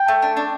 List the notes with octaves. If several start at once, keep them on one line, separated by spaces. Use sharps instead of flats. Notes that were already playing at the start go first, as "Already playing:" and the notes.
Already playing: G5
A3
D4
D4